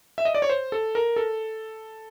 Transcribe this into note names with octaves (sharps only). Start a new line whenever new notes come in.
E5
D#5
D5
C#5
C5
A4
A#4
A4